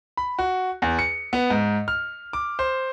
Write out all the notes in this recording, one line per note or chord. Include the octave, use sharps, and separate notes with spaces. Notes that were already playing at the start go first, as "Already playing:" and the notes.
B5
F#4
E2
C#7
B3
G#2
F6
D6
C5